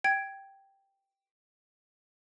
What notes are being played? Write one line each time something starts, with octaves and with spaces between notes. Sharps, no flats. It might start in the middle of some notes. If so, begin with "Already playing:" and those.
G5 G#6 D7